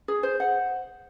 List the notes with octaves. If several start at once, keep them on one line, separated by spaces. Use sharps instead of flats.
G#4
C5
F#5